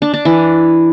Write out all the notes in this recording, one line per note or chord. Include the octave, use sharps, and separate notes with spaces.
D4
D4
E3